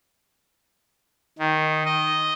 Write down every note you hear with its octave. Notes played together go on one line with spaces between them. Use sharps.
D#3
D#5